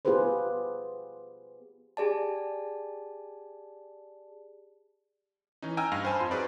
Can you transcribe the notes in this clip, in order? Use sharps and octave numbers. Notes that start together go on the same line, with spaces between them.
B3 F4 G4 G#4 B4 C5
G4 G#4 D5 A5
E3 C#4 D#4
D#5 G5 G#5 A#5 E6 F6
G2 F5 F6 A#6
C5 D#5 G#5 A5 B5
F2 F4 C6
D#4 F#4 G#4 B4 C5 D5